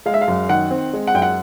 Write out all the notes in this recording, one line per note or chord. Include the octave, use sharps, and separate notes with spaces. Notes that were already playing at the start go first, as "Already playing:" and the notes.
G#3 F5
E5
F5
F#2
D#3 F#5
C4
G#3
F#5
F#2 G5
F#5